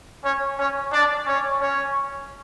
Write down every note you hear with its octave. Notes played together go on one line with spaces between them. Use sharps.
C#4 C#5
C#4 C#5
D4 D5
C#4 C#5
C#4 C#5